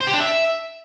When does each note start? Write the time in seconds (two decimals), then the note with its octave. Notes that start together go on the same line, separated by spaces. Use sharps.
0.01 C5
0.07 G4
0.13 D4
0.20 E5